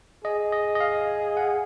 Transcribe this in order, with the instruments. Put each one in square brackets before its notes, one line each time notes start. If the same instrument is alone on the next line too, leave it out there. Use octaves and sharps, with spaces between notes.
[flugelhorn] G#4 [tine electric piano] D#5
[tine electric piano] D#5
D#5
F5
F#5